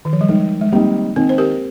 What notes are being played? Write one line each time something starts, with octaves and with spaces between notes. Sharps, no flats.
D#3
F3
G3
D#3 G#3
G#3
G3 A#3 C4 D#4
D#3 C4
C5
G4 A#4